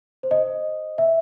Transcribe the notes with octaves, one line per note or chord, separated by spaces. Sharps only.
C5
D#5
E5